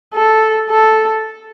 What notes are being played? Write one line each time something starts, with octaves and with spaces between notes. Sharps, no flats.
A4
A4